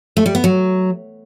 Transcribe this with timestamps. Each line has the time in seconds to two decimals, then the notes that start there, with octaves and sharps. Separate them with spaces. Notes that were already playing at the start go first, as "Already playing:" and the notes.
0.17 A3
0.26 G3
0.35 B3
0.44 F#3